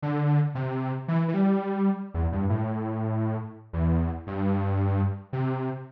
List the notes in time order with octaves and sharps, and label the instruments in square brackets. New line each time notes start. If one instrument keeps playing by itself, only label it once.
[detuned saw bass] D3
C3
E3
E3
G3
E2
G2
A2
E2
G2
C3